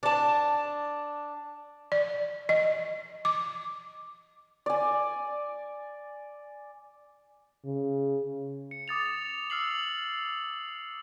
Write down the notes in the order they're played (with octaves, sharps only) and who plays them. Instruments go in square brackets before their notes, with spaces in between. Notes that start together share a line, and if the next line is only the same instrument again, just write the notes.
[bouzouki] D4 A5
[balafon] D5
D#5
D6
[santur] D5 G#5
[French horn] C#3
[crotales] C#7
D6 D#6 A6 F7
E6 F6 C7 F#7